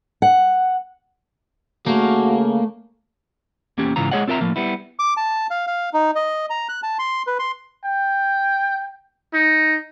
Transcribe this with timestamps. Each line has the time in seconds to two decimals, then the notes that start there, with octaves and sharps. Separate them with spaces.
0.22 F#5
1.86 C#3 A3 A#3 F#4
3.78 E2 A#3 C#4 G4
3.96 G#2 C#3 E3 F4 A#5
4.11 G#3 G#4 C#5 D#5 F#5
4.28 C4 F4 A#4 E5 A#5
4.41 A2 F3 A#3
4.56 G3 B3 E4
4.99 D6
5.17 A5
5.50 F5
5.67 F5
5.94 D#4
6.16 D#5
6.50 A#5
6.69 F#6
6.83 A5
6.99 C6
7.27 B4
7.39 C6
7.85 G5
9.33 D#4